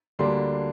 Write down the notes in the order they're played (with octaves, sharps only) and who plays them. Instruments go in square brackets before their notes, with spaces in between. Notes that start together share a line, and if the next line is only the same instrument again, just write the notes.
[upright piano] D2 D3 G3 A#3 D4 C6